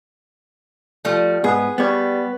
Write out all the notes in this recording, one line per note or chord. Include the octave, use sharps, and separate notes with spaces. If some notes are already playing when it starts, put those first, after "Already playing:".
F3 G3 A3
G#2 B3 G#4
G3 B3 C#5